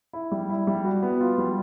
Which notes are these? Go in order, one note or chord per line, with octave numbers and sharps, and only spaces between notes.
E4
G3
E4
G3
F#4
B3
F4
G3